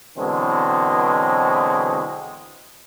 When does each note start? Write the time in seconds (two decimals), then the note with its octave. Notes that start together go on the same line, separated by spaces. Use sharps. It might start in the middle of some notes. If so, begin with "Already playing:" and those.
0.17 B2 D3 E3 F#3 G#3 C4